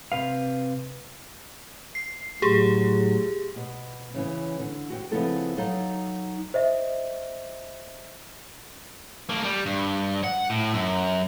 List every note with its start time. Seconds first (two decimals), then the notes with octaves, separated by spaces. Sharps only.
0.12 C3 B4 F5
1.95 C7
2.42 A2 F#3 G4 G#4
3.56 B2
4.14 C#3 E3 C#4
4.60 D3
4.90 F#4 G5
5.12 C#3 F3 B3 C4 E4 A4
5.57 F#3 D#4 A4 F5
6.54 C5 D#5 E5
9.29 A3 A#3
9.44 G3
9.66 G2
10.24 F#5
10.50 A2
10.74 F#2